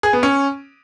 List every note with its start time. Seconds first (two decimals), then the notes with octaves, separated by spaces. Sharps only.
0.03 G#4
0.13 B3
0.23 C#4